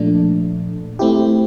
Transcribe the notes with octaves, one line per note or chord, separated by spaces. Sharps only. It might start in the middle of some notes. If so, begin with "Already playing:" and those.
Already playing: A#2 F3 A3 D4
A3 C4 E4 G4